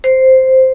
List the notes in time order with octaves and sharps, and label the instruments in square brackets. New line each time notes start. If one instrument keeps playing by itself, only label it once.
[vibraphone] C5